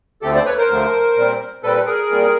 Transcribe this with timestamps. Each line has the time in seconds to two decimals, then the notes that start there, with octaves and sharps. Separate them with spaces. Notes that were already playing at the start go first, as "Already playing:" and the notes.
0.22 D2 D3 F3 A3 C4 G4 A4
0.35 C5 D5
0.46 B4 C#5
0.58 A#4 C5
0.70 D2 D3 F3 A3 C4
1.16 A#2 G3 C4
1.63 A#2 G3 C4 A4 B4
1.86 G#4 A#4
2.10 A#2 G3 C4